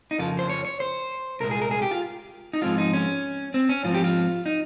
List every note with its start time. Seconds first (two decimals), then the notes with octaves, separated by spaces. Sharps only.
0.11 D#4
0.19 F2 C#3 F3 A#3 F4
0.39 C5
0.50 C#5
0.65 C#5
0.80 C5
1.40 C2 A#2 G#3 A#4
1.51 G#4
1.62 A#4
1.71 G#4
1.82 G4
1.91 F4
2.53 D#4
2.62 G#2 F3 G#3 C4 F4
2.78 D#4
2.93 C#4
3.54 C4
3.69 C#4
3.84 G#2 F3 C4 F4
3.94 G4
4.04 F4
4.46 D#4